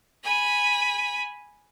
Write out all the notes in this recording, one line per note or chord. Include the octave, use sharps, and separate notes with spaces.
G#5 B5